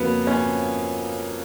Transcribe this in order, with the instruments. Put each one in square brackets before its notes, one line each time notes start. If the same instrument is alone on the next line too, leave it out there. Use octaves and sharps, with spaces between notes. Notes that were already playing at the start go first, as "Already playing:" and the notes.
Already playing: [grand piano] F2 C#3 F#3 [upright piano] A#3 B3
[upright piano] C#4